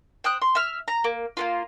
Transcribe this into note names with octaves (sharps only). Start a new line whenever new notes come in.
C5 G5 D#6 F#6
C6
E5 F6
A#5
A#3
A#3 B3 F4